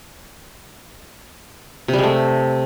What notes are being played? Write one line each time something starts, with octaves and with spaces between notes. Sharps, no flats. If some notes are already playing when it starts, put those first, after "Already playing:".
C3
G3
G#3
A3